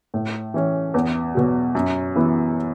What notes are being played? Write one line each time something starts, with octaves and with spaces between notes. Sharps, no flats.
A2
E3 C#4
E2
B2 F#3
F#2
E3 B3 E4